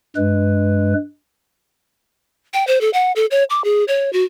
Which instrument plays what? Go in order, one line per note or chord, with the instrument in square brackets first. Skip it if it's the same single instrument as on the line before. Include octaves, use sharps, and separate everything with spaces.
[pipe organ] G2 G#3 B4
[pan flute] G5
C5
A4
F#5
A4
C#5
D6
G#4
C#5
F#4